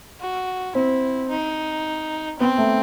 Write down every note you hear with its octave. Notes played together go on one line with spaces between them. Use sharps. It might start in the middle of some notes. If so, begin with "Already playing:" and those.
F#4
C4 E4
D#4
B3 C4
A3